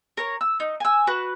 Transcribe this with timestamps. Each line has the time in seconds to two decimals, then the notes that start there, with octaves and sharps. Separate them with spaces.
0.17 A#4 C#5
0.41 E6
0.60 D#4
0.80 G#5 E6
1.07 F#4 B4